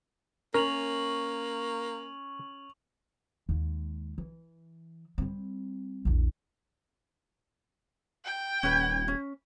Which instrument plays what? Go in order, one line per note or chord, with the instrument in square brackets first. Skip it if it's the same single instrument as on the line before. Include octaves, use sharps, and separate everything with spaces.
[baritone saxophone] A#3 [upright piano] C#4 [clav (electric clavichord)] A#4 [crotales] C#6 F7 F#7
[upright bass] D#2 G#3
E3
G3 C4
A#1 E2
[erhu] G5
[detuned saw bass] D#1 [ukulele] C#4 B4 [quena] G#6
[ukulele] C#4